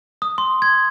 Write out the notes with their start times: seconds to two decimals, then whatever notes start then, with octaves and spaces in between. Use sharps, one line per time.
0.22 D#6
0.38 C6
0.62 G#6